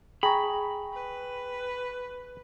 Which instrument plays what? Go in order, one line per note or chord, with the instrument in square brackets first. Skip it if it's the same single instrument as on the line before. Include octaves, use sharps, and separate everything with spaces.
[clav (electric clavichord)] G#4 A#5 [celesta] G5 C#6 [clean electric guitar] B5
[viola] B4